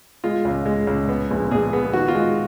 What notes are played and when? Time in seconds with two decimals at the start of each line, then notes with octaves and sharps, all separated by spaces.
0.24 G#3 F4
0.45 C#2
0.66 G#3
0.87 C#2
1.09 B3
1.31 A#1
1.51 A#1 G#4
1.73 B3
1.93 D#3 F#4
2.08 F4
2.14 G#3